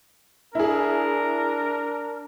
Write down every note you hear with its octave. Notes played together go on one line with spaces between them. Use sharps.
D4 E4 G#4 A#4